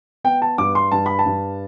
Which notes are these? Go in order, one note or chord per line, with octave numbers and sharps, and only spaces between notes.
B3 G5
A5
G2 D6
C6
G2 A5
B5
A5
G2